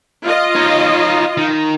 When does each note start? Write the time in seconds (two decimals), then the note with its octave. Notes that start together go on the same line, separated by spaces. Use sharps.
0.24 F4 D#5
0.56 D#4 C#5
1.37 D#3